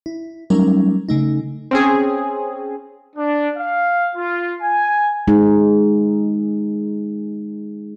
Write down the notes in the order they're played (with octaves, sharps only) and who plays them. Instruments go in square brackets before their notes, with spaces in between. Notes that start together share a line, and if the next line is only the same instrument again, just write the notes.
[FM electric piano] E4
F#3 G3 A3 C#4 D#4 A#4
C#3 A3 D#4
[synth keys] C4 C#4 G#4
[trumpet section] D4
F5
F4
G#5
[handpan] G#3 D#4 G#4